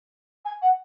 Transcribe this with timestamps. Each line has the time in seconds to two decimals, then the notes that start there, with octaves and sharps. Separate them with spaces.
0.45 G#5
0.62 F#5